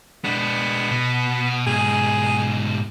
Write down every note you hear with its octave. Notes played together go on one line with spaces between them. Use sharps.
G#3 B3 D4
B2
G#2 B2 G#4